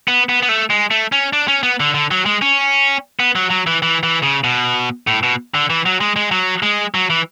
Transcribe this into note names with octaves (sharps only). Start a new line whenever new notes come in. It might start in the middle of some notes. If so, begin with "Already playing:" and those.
B3
B3
B3
A3
G#3
A3
C#4
D4
C#4
B3
D3
D3
F#3
G#3
C#4
B3
F#3
F#3
E3
E3
E3
C#3
B2
A2
B2
D3
E3
F#3
G#3
G#3
F#3
G#3
F#3
E3